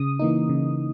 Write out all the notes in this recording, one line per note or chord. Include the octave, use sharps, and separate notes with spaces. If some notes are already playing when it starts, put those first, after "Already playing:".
Already playing: C#3 D#6
E3 A#3 D#4
C#3